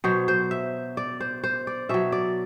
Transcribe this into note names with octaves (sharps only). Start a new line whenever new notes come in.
B2 F#3 C5
C5
E5
D5
C5
C5
D5
B2 F#3 E5
D5